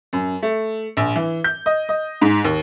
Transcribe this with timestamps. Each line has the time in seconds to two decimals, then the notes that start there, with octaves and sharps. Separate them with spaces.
0.13 F#2
0.43 A3
0.97 A#1
1.16 E3
1.44 G6
1.66 D#5
1.89 D#5
2.21 G#2
2.45 D#2